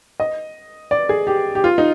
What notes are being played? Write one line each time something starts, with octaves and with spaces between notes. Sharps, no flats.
D#5
D5
G#4
G4
G4
F4
D#4